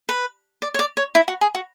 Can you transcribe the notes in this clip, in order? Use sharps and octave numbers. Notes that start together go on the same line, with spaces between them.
B4
D5
C#5
D5
C#5
E4
F#4
G#4
F#4